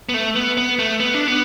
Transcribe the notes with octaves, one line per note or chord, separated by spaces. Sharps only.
B3
A3
B3
B3
A3
B3
D4
B3